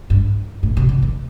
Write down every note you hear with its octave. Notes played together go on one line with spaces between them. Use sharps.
G2
A2
B2
C3
D#3